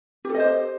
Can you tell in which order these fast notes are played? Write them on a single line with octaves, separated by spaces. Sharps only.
G4 A4 D#5 C5